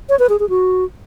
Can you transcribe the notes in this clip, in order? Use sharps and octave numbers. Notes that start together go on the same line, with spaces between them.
C#5
B4
G#4
G#4
F#4